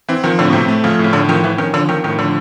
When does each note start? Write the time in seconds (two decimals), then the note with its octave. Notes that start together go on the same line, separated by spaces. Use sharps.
0.08 E3 C4
0.24 D#3 F3
0.39 A2 D3
0.50 B2
0.53 C3 C4
0.68 A3
0.84 C#3 F3
0.99 A2
1.04 C#3
1.13 A2 D3
1.29 D#3 F3
1.43 E3 F3
1.58 D#3 C#4
1.73 D3 F3
1.89 D#3 F3
2.04 A2 D#3
2.18 D3 F3